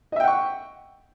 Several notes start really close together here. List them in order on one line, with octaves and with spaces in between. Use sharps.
D#5 E5 G5 F#5 C#6